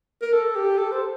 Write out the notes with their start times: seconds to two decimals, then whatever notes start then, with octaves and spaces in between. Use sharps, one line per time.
0.22 A#4
0.33 A4
0.56 G4
0.78 A4
0.92 C5